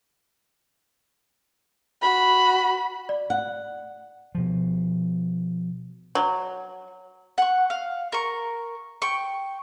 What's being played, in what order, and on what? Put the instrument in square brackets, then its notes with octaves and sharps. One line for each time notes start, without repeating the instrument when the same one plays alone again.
[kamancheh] F#4 B5
[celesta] D5
[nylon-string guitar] F#5
[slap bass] B2 F3
[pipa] F#3
[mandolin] F#5 C#6
F5
A#4 C#6
G5 C#6